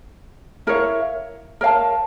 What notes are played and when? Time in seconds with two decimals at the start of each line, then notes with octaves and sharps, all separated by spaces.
0.67 E4 A#4 C#5 F5
1.61 A#4 C#5 F5 A5